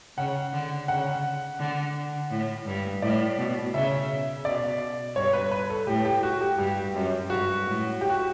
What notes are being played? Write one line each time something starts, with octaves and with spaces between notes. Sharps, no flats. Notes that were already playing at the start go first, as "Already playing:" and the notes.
C#3 F#5
D3
C#3 F#5
D3
A2
G2
A2 D5
B2
C#3 E5
B2 D5
G2 C#5
B4
B4
A4
A2 G4
G4
F#4
G4
G2 G4
F#2
G2 F#4
A2
G4
F#4